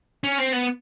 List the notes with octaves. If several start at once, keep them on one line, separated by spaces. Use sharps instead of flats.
C#4
C4
B3